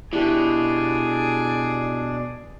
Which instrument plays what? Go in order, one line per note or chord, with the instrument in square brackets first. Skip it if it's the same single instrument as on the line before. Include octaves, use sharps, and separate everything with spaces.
[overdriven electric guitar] B2 [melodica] D4 [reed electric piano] E4 G4 [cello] G#4 D5